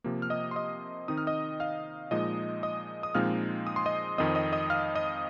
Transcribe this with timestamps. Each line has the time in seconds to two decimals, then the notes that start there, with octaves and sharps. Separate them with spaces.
0.04 C3 F3 A#3
0.22 F6
0.30 D#5 D#6
0.51 C6
0.56 D#5 D#6
1.08 D#3 C4 D#4 D#6
1.18 F6
1.27 D#5 D#6
1.60 F5 F6
2.11 A#2 F3 G#3 D#4 D#5 D#6
2.63 D#5 D#6
3.03 D#6
3.15 A#2 F3 G#3 C4 D#4 F5 F6
3.67 D#6
3.76 C6
3.86 D#5 D#6
4.18 F2 D#3 C4 D#5 D#6
4.35 D#5 D#6
4.52 D#5 D#6
4.70 F5 F6
4.95 D#5 D#6